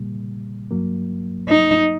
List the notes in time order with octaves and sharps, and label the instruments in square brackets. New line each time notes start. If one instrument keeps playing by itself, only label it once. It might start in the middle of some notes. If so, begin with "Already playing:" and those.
Already playing: [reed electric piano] A#2 G3 A#3
G2 F#3 A#3
[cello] D#4